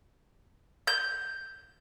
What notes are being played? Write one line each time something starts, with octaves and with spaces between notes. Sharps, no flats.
G6